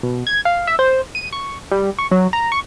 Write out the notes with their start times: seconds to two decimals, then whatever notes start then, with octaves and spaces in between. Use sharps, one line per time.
0.03 B2
0.27 G#6
0.45 F5
0.67 E5
0.79 C5
1.15 D#7
1.33 C#6
1.72 G3
1.99 C#6
2.11 F#3
2.33 A#5
2.52 C#6